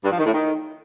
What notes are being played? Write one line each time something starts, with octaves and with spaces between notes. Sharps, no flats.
G2
F3
D#3
A2
D#3